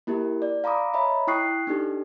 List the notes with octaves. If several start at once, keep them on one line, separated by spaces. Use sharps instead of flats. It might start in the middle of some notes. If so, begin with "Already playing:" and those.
A#3 E4 G4 A#4
D5
F5 A#5 B5 D6 D#6
C#5 D#5 E5 A#5 B5
E4 G5 C#6 D#6 F#6 C7
D4 D#4 G4 A4